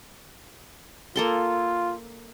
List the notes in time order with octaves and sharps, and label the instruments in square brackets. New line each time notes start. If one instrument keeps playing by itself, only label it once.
[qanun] A#3 A4 C6 [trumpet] F4